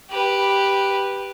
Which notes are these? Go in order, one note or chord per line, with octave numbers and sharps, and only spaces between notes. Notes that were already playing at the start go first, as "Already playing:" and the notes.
G4 B4